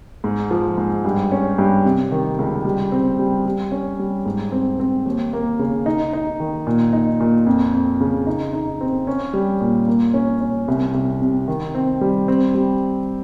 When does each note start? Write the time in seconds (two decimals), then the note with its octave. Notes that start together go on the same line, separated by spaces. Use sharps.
0.24 G#2
0.51 F3
0.77 G#2
1.05 G2
1.32 C#4
1.58 G2
1.85 C3
2.12 D#3
2.39 C#2
2.65 G3
2.92 C4
3.19 G3
3.45 G3
3.72 C#4
3.99 G3
4.25 G#2
4.52 C4
4.80 C4
5.06 D#2
5.33 A#3
5.59 C#3
5.86 D#4
6.13 D#4
6.40 D#3
6.67 A#2
6.93 D#4
7.20 A#2
7.46 F2
7.74 F2
8.00 C#3
8.27 D#4
8.53 D#4
8.81 C4
9.07 C#4
9.33 G3
9.61 A#2
9.88 A#3
10.14 C#4
10.41 C#4
10.68 C2
10.94 C2
11.22 C3
11.48 D#3
11.75 C4
12.01 G3
12.28 C4
12.55 G3